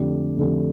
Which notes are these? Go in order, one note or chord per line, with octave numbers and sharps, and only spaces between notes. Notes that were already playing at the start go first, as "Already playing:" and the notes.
Already playing: F2 D3 A3 D4 G4
F2 D3 A3 D4 G4